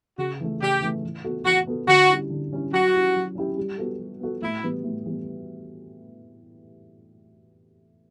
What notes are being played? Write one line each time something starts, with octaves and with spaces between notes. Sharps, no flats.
C#3 F#4
E3 A3
C#3 G4
E3 A3
E3
B3 F#4 A4
E3 F#4
B3 F#4 A4
D3 F#4
G3 C#4 E4
D3
G3 C#4 E4
F#3 F#4
C#4 E4 G4
F#3
C#4 E4 G4
G3
B3 F#4 A4
G3
B3 F#4 A4
A2 E4
E3 G3 B3
A2
E3 G3 B3